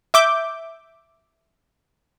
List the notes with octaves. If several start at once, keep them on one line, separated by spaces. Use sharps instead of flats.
E5 D6 G6